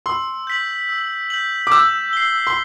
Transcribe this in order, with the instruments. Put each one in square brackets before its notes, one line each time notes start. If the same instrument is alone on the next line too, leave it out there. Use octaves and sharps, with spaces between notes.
[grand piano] C6 [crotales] E6
[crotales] G6 B6 F#7
E6
G6 B6 F#7
[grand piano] D6
[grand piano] E6 [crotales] G6
[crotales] C7 G7
[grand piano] C6